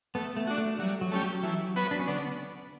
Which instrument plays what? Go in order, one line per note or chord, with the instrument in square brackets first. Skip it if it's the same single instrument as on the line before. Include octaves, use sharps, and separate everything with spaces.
[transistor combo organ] A3 [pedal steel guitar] B3
[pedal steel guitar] A3
[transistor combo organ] D4 F#4
[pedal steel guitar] A3
[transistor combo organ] F#3 [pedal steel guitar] G3
[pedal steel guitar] F#3
[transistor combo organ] A3 C#4 G4
[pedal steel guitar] F#3
[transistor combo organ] E3
B3 F#4 B4
[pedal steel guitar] D4
C#4
[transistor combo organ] D3 [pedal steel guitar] B3